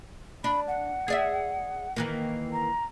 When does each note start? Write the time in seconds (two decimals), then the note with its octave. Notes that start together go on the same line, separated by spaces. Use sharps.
0.44 D4 B5
0.68 F#5
1.08 G#4 D5 E5
1.96 D#3 E3 A#3
2.53 A#5